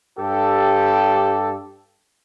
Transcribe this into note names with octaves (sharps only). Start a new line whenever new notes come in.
G2 G4 A4